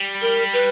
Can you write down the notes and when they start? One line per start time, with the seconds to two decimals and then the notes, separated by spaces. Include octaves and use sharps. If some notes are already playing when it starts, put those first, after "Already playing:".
Already playing: G3
0.22 A#4
0.53 B4